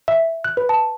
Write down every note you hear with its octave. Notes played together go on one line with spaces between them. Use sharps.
E5
F#6
B4
A5